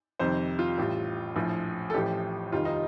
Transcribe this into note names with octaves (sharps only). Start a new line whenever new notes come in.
F2 C3 D#3 G3 C5
F4
A1 A2 G3
A#1 A2 F3
A4
A1 A2 F3 G4
F1 D#2 D#3 G3 F4
D#4